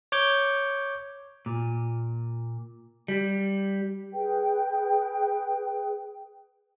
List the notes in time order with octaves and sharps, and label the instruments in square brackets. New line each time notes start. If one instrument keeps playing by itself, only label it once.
[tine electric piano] C#5 D6 G6
[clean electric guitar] A#2
G3
[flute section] G#4 B4 G5